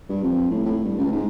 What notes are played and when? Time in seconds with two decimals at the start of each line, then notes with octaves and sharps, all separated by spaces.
0.09 G2
0.23 F2
0.51 A2
0.66 A2
0.84 G2
0.98 C#2
1.12 G#2